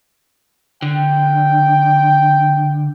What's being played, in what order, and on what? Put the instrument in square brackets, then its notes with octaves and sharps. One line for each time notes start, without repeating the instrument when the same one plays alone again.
[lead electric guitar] D3 [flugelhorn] G5